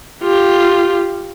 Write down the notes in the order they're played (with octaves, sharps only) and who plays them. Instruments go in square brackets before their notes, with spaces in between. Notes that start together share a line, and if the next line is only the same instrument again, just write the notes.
[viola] F4 G4